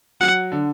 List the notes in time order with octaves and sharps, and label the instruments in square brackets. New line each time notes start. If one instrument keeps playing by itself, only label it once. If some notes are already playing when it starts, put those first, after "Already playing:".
[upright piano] F#3 [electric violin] F#5
[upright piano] D3